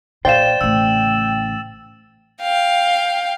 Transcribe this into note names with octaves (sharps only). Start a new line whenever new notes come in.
A#2 C5 D5 F5 G5 A6 E7
A1 C#3 E6
F5 G5